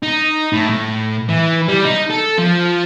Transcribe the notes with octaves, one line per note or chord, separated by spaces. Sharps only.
D#4
A2
A2
E3
G3
D#4
A4
F3